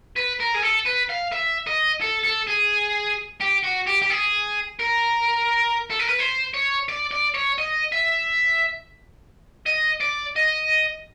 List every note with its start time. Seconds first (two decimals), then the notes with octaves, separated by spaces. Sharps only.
0.16 B4
0.40 A#4
0.55 G#4
0.63 A4
0.86 B4
1.10 F5
1.32 E5
1.67 D#5
2.02 A4
2.25 A4
2.48 G#4
3.41 G4
3.64 F#4
3.87 G4
4.02 G4
4.10 G#4
4.79 A#4
5.90 A4
5.99 A#4
6.08 B4
6.19 C5
6.54 C#5
6.89 D5
7.11 D5
7.35 C#5
7.58 D#5
7.92 E5
9.66 D#5
10.01 D5
10.36 D#5